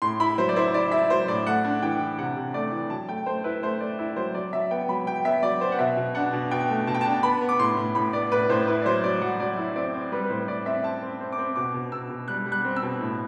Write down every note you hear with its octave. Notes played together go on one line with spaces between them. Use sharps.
A2 C6
E4 B5
F#3 C5
D5
E4 C5
E4 D5
E4 E5
F#3 C5
A2 D5
A3 F#5
D4
E3 G5
E3
C3 F#5
C3
A3 D5
E3
F#3 A5
A3 G5
A3 C5
E4 B4
A3 C5
A3 D5
E4
F#3 C5
F#3 D5
F#3 E5
B3 G5
F#3 B5
F#3 G5
B3 E5
F#3 D5
B3 C5
F#5
B2 E5
B2
D4 F#5
B2
B2 G5
A3
B2 A5
G5
D4 A5
B3 B5
B3
D6
A2 C6
A2
A2 B5
B3 D5
A2 B4
A2 C5
E4 B4
D5
F#3 C5
F#3 D5
F#3 F#5
F#3 D5
E4
C4 D5
C4
G3 B4
B4
A2 C5
A2 D5
C4 E5
C4 A5
C4
C4
D6
C4
B2 D6
B2
B2 E6
B2
G3 F#6
G3
F#6
C4
E6
B2
A2